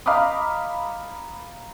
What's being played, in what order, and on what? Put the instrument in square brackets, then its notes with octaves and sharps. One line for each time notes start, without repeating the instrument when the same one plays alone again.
[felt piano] D#5 F5 A#5 B5 D6 D#6